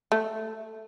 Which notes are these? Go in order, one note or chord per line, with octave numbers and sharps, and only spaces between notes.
A3